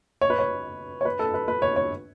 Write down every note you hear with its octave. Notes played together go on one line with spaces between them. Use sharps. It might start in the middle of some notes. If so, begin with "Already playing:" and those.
C#5
B4
C#5
C#5
B4
A4
B4
B4
C#5
C#5